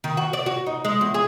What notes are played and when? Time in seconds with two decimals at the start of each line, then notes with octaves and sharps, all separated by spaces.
0.04 D#3
0.17 F#4
0.33 D5
0.46 F#4
0.66 D#4
0.85 G#3
1.01 E2
1.14 G#4